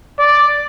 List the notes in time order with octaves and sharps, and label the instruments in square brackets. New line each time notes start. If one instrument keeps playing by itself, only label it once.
[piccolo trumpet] D5